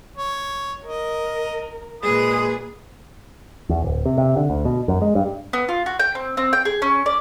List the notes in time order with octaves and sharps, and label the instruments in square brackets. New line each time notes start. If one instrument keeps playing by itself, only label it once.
[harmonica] C#5
[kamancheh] A#4 [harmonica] D#5
[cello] A#2 G#4 [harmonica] G#3 D#6 [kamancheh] B4
[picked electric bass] E2
D1
C3
C3
D3
D2
B2
F#2
G#3
G2
[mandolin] B3
F4
F#4
G5
C4
C4
G5
G#4
C#4
D5